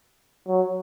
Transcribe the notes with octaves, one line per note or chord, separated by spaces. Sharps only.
F#3